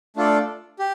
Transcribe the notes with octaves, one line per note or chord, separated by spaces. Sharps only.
A3 D4 F4 A4 D5
G4